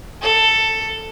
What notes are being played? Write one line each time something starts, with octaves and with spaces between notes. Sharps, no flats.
A4